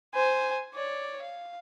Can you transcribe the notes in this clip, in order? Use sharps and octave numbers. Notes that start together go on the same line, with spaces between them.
C5 G#5
C#5 D5
F5